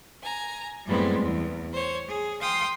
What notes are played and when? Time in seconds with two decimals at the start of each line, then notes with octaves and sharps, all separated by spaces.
0.23 G#5 A#5
0.86 F#2 A2 G3 G#3 B3 C4
1.19 E2
1.71 C5 C#5
2.09 G#4
2.41 F5 G5 C6 D#6